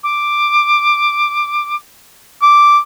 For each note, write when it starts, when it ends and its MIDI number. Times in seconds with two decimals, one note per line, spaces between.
0.03 1.75 86
2.42 2.78 86